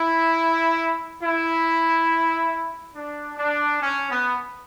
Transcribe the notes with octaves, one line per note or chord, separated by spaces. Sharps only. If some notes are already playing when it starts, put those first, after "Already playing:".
Already playing: E4
E4
D4
D4
C#4
B3